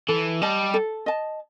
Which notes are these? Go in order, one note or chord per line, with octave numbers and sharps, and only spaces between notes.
E3 A4
G3 D#5 A5
A4
D#5 A5